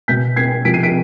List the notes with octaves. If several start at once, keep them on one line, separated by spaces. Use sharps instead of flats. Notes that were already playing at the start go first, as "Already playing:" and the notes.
B2 G6 B6
G#6 C7
C3 F3 B6 D7
C7 D#7
B6 D7